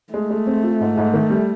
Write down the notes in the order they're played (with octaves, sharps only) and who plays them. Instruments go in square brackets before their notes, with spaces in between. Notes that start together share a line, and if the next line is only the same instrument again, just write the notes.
[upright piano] G#3 [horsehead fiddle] A3
[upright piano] G#3
C4
F4
G#2
G#2
D#3
G3